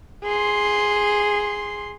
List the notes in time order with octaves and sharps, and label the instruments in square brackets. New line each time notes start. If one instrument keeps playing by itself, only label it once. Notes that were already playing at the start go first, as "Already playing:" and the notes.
[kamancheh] G#4 C6